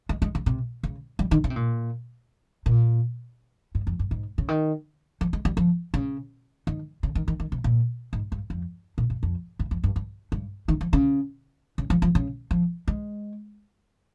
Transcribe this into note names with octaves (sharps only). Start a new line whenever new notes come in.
G#3
G#3
C#3
C3
C#3
G3
D#3
C#3
C3
A#2
A#2
G#2
F2
G2
G#2
C#3
D#3
F3
G#3
G3
F3
C#3
D#3
C#3
D#3
D#3
D#3
C3
A#2
G#2
G2
F2
A#2
G2
F2
G2
F2
G2
G2
G2
D#3
F3
C#3
C#3
F3
F3
C#3
F3
G#3